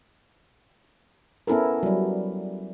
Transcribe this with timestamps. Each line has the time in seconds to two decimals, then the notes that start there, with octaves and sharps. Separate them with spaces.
1.47 B3 C#4 E4 A4 A#4
1.83 F#3 G3